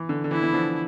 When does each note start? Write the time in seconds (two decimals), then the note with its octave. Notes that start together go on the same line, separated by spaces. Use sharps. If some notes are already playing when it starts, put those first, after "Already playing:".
Already playing: E3
0.09 D3
0.24 D3
0.31 E3 E4
0.43 E3
0.53 D3 F3